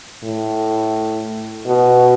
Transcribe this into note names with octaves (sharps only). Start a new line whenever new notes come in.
A2
B2